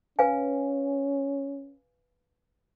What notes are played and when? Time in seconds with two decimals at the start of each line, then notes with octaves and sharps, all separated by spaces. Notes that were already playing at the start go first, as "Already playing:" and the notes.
0.19 C#4 B4 F5 G#5